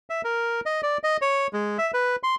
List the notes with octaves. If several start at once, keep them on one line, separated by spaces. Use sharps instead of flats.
E5
A#4
D#5
D5
D#5
C#5
G#3
E5
B4
C6